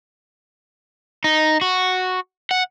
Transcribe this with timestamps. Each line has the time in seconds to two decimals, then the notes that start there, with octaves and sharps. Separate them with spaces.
1.24 D#4
1.61 F#4
2.51 F#5